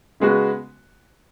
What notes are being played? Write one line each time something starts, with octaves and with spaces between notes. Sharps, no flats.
C#3 G#3 B3 F#4